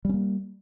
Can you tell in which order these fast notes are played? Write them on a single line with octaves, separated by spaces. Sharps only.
G3 C#4 A#3